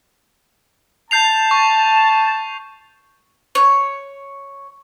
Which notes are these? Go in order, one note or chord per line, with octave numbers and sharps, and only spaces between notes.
A5 G6 C7 F7
C#6
C#5